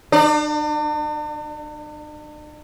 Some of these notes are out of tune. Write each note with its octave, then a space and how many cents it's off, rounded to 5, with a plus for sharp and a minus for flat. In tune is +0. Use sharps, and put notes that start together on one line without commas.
D4 +45 D5 +15